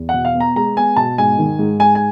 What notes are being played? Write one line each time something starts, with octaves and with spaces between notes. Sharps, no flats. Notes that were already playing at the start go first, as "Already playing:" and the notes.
Already playing: E2
B2 F#5
F5
B3
A#5
G#3 A#5
B3 G#5
B2 A5
G#2 G#5
D#3
G#2
G#2 G#5
G#5